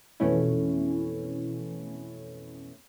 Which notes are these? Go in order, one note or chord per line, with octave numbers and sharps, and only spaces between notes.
F2 B2 E3 A3 C#4 E4